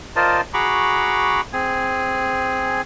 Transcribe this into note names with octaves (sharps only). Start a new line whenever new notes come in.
F4 A#4 C5 D5 D#5 A5
F#4 G#4 A#5 B5 C#6 D6
C4 G#4 G#5